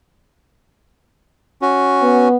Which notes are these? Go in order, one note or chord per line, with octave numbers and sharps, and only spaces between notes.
C#4 F#4
B3